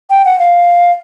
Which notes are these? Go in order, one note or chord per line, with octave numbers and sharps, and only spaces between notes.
G5
F#5
F5